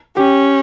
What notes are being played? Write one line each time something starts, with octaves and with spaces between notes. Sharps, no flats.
C#4 G4